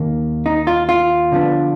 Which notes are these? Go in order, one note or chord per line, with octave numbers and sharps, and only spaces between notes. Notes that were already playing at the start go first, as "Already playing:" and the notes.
Already playing: D#2 D#3 A#3
D#4
F4
F4
D3 F3 B3 D4